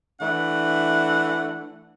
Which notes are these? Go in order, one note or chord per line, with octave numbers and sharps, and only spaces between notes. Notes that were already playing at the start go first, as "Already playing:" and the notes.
E3 A3 D4 F#5